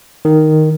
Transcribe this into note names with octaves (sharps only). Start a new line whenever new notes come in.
D#3